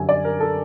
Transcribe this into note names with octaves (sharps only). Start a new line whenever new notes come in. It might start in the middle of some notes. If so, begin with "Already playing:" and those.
Already playing: F#2 D3 G3 G#5
D5
A#4
A4